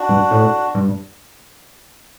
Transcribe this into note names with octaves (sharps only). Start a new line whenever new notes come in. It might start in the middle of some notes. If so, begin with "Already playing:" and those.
Already playing: D4 F#4
G2
A2
G2